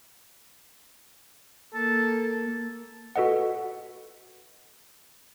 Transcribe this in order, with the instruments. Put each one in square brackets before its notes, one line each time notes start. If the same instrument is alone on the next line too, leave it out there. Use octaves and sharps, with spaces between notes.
[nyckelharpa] A#3 [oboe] A4
[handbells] F#4 A4 B4 D#5 F#5